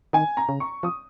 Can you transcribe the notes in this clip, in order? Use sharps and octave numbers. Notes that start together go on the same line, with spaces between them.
D#3 G#5
A#5
C#3
C#6
F3 D#6